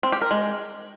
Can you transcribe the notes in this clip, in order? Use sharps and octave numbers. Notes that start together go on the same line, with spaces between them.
C4
G4
A#4
G#3